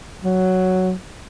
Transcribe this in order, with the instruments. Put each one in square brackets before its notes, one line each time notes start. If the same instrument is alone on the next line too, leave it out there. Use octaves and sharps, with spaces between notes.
[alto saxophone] F#3